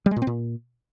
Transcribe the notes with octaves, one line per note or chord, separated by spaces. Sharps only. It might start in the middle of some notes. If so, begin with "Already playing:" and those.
G3
G#3
A#2
C4
A#2